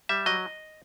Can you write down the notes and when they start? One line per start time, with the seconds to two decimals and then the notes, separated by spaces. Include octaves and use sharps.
0.09 G3 E5
0.26 F#3 D#5